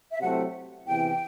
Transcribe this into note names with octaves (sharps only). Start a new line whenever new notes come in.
E5
C3 F#3 A3 C4 E4 F#5
E2 C3 E3 G5